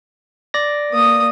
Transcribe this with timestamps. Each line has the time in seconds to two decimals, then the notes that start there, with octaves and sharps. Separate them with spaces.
0.54 D5 A#6
0.91 A#3 D#6